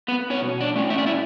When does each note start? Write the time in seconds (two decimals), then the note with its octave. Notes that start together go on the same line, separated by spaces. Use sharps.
0.08 B3 B4
0.30 B2 C#4 C#5
0.61 D4 D5
0.76 A3 C#4
0.90 E5
0.98 D5
1.07 E4 E5